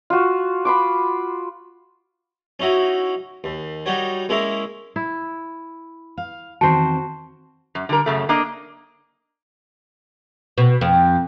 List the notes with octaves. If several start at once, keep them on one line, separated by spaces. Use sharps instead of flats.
F4 F#4
B5 C6 D6
C#4 D#4 E4 F#4
D#2
G3 D#4 F#4 C#5
G#3 A#3 C#4 E4 A#4
E4
F5
E2 D#3 C4 F#4 C5 A5
F#2
D3 G3 A#4
F#2 C#3 A3
A#3 D4 D#5
B2
F2